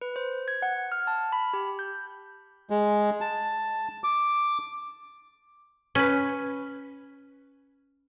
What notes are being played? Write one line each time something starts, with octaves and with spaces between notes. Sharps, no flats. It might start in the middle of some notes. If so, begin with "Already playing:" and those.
B4
C5
G#6
F#5
F6
A5
B5
G4
G6
G#3
A5
D6
C#4 B4